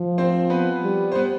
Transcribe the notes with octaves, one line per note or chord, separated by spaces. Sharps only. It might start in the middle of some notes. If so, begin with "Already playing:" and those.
Already playing: F3
C4 C5
B3 B4
G3
C5
B3 B4